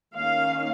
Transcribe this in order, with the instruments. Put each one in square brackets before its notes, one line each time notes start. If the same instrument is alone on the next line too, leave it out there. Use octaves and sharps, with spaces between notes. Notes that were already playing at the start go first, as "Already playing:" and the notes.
[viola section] D#3 A#3 C#4 F5